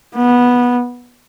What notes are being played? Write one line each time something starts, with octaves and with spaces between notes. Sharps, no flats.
B3